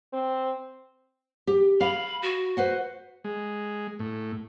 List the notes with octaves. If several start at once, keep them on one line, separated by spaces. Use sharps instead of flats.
C4
G4
F5 B5
F#4
B4 C5 F#5
G#3
A2